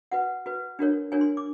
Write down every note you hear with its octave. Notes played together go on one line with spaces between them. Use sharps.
F#4 B4 F#5
F#4 B4
D4 F#4 A#4 C#5
D4 F#4 A#4 C#5 G#5
C6
D6